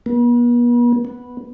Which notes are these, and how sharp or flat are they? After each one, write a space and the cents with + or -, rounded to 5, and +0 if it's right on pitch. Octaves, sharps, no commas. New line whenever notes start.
B3 -45
B3 -5